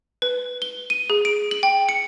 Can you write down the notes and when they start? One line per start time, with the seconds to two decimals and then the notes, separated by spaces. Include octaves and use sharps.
0.22 B4
0.62 G7
0.90 D#7
1.10 G#4
1.25 D7
1.51 F#7
1.63 G5
1.89 C#7